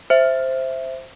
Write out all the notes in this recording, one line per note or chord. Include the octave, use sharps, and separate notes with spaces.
C5 E5